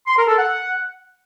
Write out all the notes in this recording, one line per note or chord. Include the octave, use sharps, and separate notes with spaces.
C6
A#4
A4
F#5